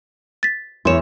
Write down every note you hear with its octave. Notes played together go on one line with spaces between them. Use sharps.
A6 B6
E2 E4 C#5 C6 E7